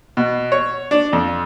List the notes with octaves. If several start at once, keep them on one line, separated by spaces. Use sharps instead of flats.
B2
C#5
D4
F2